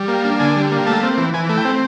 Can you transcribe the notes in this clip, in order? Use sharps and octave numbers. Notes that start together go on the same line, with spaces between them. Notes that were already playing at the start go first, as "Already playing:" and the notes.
Already playing: G3
A#3
D4
D3 G#5
G3
A#3
A3 A5
C4
E3
E3 G#5
A3
G5
C4